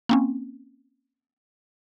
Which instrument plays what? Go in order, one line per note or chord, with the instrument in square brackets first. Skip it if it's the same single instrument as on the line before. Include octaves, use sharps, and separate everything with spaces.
[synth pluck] A#3 C4 C#4